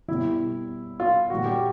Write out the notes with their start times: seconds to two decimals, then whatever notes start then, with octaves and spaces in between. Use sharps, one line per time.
0.08 B2 G3 E4
1.00 F4
1.30 A#2 G3 F#4
1.46 G4